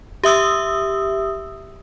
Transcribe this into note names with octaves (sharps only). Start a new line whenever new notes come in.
G4 E5 D#6 E6